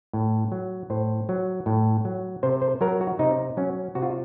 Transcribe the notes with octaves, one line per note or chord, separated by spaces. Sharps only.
A2
F#3
A2 C5
F#3
A2
F#3
C3 C5
C5
F#3 A#4
F#4
C3 D#4
F#3 C#4
C3 F#4
F4